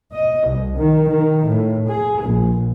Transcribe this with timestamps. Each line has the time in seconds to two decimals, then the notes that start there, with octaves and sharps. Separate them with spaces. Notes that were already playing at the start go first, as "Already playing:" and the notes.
0.13 D#5
0.47 C2
0.77 D#3
1.09 D#3
1.46 A2
1.88 G#4
2.22 A#1